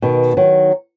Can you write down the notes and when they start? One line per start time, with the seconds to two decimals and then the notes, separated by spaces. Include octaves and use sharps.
0.02 B2 D#3
0.37 D#3 F#3